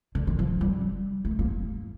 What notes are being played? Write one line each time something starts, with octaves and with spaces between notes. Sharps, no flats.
D3
D#3
F3
G3
A3
A#3